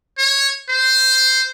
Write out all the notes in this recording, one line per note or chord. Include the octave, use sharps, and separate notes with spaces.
C#5
C5